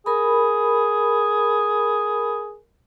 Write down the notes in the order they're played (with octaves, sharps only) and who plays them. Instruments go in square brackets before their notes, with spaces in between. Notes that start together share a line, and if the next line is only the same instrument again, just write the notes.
[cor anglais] G#4 [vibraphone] A#4 B5